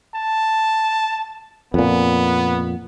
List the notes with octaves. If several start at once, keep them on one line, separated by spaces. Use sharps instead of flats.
A5
F2 A#2 B3